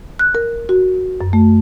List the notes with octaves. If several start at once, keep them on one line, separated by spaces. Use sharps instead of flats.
F#6
A#4
F#4
F#2
A3